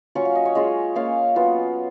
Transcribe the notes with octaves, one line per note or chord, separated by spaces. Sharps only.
F#3 C#4 F4 C#6
F5
D#5
C#5
G#3 C#4 F4 D#5
A#3 C#4 F4 F5
F#3 B3 F4